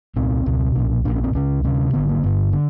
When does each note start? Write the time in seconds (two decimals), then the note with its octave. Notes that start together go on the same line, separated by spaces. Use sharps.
0.16 C2 A#2 C4
0.46 C#2 B2
0.75 B1 A#2 C#4
1.05 A#1 A#2 D4
1.15 C#4
1.24 C4
1.34 C#2 C#3 C#4
1.64 D2 C3 C#4
1.93 G#1 G2 D3 B3
2.09 A#3
2.23 G1 G2 D3 B3
2.53 D3